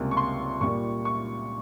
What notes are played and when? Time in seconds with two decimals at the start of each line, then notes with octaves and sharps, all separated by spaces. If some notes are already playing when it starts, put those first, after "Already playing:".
Already playing: C#2 C3 G3 A#3
0.11 C#6
0.17 C6
0.61 A#2 G3 A#3 C#6
1.05 C#6